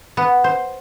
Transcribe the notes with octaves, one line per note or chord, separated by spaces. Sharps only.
B3
C5